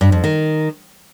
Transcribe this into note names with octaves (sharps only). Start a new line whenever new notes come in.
G2
F2
D#3